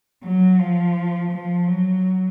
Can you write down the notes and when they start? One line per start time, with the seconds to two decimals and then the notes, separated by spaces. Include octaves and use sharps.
0.24 F#3
0.59 F3
1.31 F3
1.67 F#3